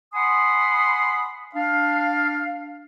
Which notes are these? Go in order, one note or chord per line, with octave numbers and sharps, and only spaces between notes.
F#5 G#5 B5 C6 D#6
D4 F5